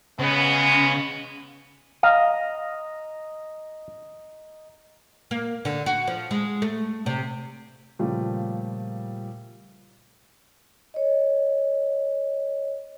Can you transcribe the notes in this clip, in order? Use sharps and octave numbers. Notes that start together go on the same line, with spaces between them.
C#3 G#3 B3
D#5 F5 A#5 D#6
A#3
D3
F#4
F3
G#3
A3
C3
A#2 C#3 F3 G3 A3
C#5 D#5